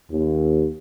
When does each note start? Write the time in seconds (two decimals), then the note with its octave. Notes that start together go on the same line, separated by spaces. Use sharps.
0.11 D#2